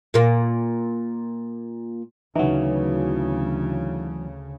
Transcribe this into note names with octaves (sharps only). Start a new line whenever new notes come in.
A#2 A#3
D2 C#3 E3 F#3 D#4